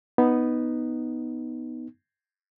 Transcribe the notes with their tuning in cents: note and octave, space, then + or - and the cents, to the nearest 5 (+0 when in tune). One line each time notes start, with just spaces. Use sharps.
B3 +0 D#4 +0